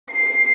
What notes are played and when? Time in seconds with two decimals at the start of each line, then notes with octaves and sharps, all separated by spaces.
0.13 C7